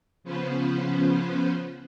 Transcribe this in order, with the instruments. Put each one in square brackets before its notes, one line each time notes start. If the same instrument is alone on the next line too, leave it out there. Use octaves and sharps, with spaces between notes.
[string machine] C#3 F3 B3 C#4 B4 C5